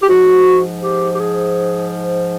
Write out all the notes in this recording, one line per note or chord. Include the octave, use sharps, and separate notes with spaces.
G4
G#2 F3 F#4
G4
G4
G#4